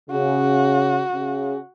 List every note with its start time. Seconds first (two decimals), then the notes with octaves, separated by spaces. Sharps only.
0.10 C#3 F#4
1.12 C#3